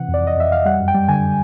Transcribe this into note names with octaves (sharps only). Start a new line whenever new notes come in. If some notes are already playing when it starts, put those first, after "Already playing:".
Already playing: C3 E3 F#5
F2
D5
F2 D#5
F2 E5
F2 F5
G3 F#5
F#2
G5
G3
D3 G#5